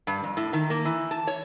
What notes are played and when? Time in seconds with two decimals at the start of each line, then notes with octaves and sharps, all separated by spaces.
0.07 G2
0.24 F2
0.37 A2
0.53 D#3
0.70 A#3
0.85 E3
1.11 A5
1.27 C#5